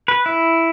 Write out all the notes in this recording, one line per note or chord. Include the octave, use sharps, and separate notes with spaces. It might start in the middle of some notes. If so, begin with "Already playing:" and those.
B4
E4